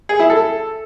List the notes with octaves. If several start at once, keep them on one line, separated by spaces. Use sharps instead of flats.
G#4
E4
A4